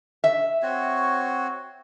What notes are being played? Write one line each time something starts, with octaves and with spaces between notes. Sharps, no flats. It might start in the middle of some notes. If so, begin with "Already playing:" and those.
E5
C4 F#4 C#5